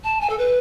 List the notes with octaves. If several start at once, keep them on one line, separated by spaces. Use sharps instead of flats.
A5
G#5
A4
B4